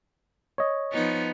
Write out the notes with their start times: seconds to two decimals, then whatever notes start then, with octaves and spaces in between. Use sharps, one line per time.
0.58 C#5 D#5
0.92 F3 B3 D#4